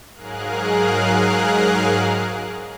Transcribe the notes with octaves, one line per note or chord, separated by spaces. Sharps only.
G#2 F#3 G#4 A#4 F5 F#6